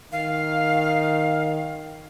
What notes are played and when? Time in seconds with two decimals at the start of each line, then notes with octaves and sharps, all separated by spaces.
0.12 D#3 F5